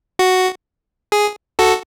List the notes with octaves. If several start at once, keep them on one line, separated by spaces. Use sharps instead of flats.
F#4
G#4
F#4 A4